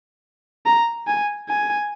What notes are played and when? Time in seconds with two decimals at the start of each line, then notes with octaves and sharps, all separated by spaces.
0.66 A#5
1.07 G#5
1.49 G#5